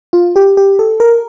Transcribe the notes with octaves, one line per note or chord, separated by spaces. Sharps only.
F4
G4
G4
A4
A#4